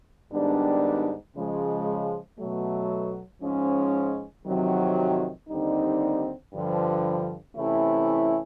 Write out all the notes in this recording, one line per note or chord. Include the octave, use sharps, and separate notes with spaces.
G#2 D#3 G3 B3 D4
C#3 F3 G#3
B2 F#3 A3
G#2 F3 G#3 C#4
F2 C3 D#3 F#3
D#2 D3 G3 C4 D#4
G2 D3 F3
C3 E3 A3 C#4 E4